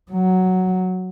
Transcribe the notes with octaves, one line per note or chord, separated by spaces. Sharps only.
F#3